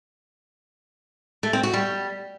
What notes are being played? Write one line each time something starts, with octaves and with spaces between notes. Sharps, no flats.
A3
C4
F#4
G3